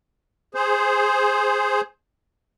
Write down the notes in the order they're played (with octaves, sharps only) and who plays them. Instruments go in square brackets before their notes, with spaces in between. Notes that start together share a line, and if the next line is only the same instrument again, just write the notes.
[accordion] G#4 C5